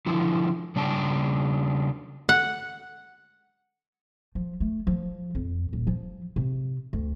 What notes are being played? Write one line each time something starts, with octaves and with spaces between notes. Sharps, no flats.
D3 F3 E4
C#3 G3 D4 G5 A5
F#5
F3
A3
F3
F2
D#1
F3
C3
D2